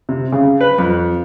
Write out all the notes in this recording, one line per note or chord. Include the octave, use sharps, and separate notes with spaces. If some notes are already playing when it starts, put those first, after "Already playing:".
C3
C#3
B4
F2